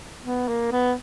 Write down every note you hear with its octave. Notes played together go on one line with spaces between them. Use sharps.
B3
A#3
B3